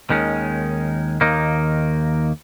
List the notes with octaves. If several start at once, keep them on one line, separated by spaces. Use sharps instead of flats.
D#2 D#3 G#3 C#4
D#2 D#3 A#3 D#4